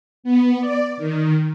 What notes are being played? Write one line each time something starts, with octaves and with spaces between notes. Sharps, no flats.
B3
D5
D#3